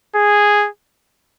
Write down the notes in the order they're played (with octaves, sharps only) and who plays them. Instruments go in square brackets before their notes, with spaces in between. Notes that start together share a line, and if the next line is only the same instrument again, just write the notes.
[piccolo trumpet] G#4